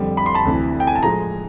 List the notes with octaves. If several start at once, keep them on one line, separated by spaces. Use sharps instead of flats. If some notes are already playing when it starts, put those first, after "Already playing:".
Already playing: F2 D3 G3
B5
C6
A5 B5
D2 C3 E3
G5
G#5
A5
A2 F3 G#3 G#5 A#5